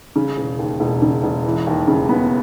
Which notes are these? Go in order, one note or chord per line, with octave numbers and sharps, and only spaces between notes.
C#3
E1
D#2
E1
C#3
E1
E3
D#2
C#3
B3